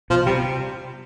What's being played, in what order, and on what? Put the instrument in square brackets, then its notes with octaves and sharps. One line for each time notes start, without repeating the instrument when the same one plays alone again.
[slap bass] B2 [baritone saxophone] F3
[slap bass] C3 [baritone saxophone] G3